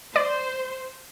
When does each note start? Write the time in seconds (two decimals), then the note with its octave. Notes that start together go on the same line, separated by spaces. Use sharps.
0.16 C5 D5